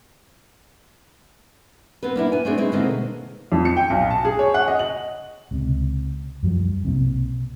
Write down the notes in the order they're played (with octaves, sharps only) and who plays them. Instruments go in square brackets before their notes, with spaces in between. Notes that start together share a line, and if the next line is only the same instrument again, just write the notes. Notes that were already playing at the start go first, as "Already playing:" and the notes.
[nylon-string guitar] B3 C4 B4
A#3 D4 E4
B3 G#5
A3 C4 D4 G#4
G#3 C4 D#4 E4
B2 D3 D#3 G#3 A#3 C4
[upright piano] F2
C#7
G5
B1
A5
G#4
C#5
F#5
D#5
F#7
[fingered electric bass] C#2 C3
F#2 F3 G3
B1 C3 F#3 A#3